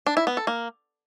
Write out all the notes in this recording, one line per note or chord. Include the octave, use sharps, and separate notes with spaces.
D4
E4
B3
A4
A#3